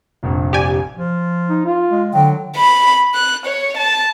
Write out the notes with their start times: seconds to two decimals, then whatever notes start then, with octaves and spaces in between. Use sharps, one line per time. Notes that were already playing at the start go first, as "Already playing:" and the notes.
0.23 F1 A#1 G2
0.53 G4 D5 G#5
0.97 F3
1.50 D#4
1.65 F4
1.91 G#3
2.14 D3 F#3 G5
2.56 B5
3.15 F#6
3.46 C#5
3.77 A5